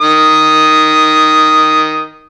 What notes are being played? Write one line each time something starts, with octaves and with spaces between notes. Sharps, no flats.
D#3 D#6